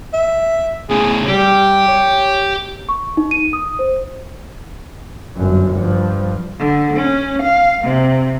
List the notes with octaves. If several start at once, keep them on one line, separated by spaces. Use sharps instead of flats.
E5
A2 C#3 G#4
G3 G4
C#5
C#6
D#4
D#7
D#6
C5
G1 F#2
G2 F3
D3
C#4
F5
C3